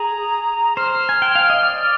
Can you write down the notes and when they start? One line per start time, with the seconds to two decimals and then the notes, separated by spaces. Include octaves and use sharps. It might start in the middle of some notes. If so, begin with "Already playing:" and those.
Already playing: G#4 A#5
0.77 C5 F6
1.09 G#5
1.22 G5
1.35 F5
1.50 D#5
1.63 D5